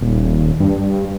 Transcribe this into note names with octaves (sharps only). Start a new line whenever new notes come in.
D#1
G2